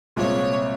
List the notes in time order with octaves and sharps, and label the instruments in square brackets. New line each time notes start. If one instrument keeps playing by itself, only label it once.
[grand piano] C2 A#2 G#3 C4 F4 [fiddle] C#5